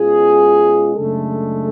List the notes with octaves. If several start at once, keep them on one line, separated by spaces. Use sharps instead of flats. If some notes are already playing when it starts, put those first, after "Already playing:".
Already playing: B2 G#3 C#4 F4 G#4
F#2 C#3 G#3 A3 D4 A4